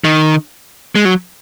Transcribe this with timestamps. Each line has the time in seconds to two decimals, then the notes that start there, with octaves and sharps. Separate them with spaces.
0.04 D#3
0.95 G#3
1.05 F#3